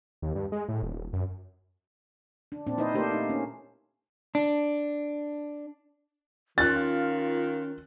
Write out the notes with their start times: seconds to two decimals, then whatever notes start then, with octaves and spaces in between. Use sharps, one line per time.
0.22 D#2
0.35 G2
0.52 G#3
0.68 A2
0.82 D#1
1.13 F#2
2.52 D4
2.67 A#2 C4 D4
2.78 D#4 E4 B4 C5 D#5
2.94 A3 A#3 D4 G4 A#4 C5
3.11 D#4
3.30 C#4
4.35 D4
6.58 D#3 C#4 F4 F#6 A6